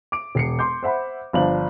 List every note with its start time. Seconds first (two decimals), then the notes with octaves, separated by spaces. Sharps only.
0.12 D6 D7
0.35 E1 C7 C#7
0.59 C6 D6 G6
0.83 C5 E5 F#5 B5
1.33 G1 F3 D4 F#7